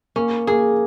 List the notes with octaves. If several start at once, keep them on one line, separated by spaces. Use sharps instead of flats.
A#3 C#4
A#3 G#4